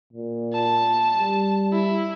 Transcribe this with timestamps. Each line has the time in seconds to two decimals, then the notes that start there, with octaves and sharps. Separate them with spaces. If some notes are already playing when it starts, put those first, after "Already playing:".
0.13 A#2
0.53 A5
1.14 G3
1.72 E4